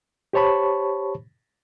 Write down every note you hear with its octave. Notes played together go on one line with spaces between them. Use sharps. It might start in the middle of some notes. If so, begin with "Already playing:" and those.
G4 C5 C#5 A5 B5 C#6